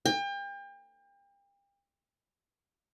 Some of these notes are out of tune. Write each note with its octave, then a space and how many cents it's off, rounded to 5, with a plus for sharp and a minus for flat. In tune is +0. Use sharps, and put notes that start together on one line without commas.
G5 +35